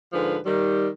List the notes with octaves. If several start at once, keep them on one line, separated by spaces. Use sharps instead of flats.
G#2 D3 F3 B4
D#3 G3